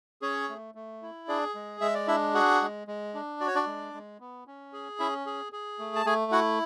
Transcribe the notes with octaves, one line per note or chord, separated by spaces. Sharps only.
C#4 G#4 C#5
A3
A3
E4
D4 G#4 D5
G#3
G#3 E5
D5
D4 E4 E5
F#4 G#4 F#5
G#3
G#3
D4
F#4 D5
C#5
D4 D5
G#3
G#3
B3
C#4
G#4
C#4 E4 E5
G#4
G#4
A3
A5
A3 G#4 G#5
E4 F#4 F#5